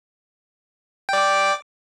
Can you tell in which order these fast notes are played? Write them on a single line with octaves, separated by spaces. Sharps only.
G5 D5 D6